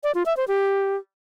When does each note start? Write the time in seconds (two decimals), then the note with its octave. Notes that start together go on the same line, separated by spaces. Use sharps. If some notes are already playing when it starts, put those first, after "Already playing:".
0.04 D5
0.15 F4
0.26 E5
0.37 C5
0.48 G4